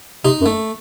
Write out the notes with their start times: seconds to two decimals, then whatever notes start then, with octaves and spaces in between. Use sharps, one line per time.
0.25 C3 D#4
0.41 F#2
0.46 A3